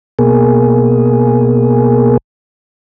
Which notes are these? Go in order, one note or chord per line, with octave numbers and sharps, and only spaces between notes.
B2 A#3 G#4